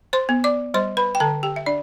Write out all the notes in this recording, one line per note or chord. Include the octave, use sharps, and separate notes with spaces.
C5 C6
B3
D5 D6
G3 C5 C6
B4 B5
G5
D3 A4 A5
G4 G5
E5
D4 D5